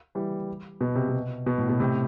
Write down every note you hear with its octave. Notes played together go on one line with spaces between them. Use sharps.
E3 G3
B2
C3
B2
B2
A2
B2
A2 C3